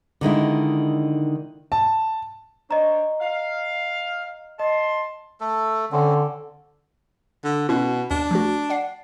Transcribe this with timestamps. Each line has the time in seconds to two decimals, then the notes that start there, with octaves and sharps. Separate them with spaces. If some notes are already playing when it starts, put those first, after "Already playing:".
0.21 D3 D#3 G#3 E4
1.72 A5
2.71 D4 C5 C#5 D#5 A#5
3.21 F5
4.59 D#5 A5 C6
5.40 A3 A4
5.92 D3 C4 C#4
7.44 D3
7.69 B2 C#4 E4
8.11 D#2 D4
8.31 F3 A3 F#4
8.70 D5 F#5 C7